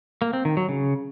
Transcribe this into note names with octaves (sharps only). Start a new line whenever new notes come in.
A#3
C4
D#3
F#3
C#3